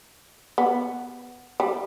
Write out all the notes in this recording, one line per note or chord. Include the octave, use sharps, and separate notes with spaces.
B3
G3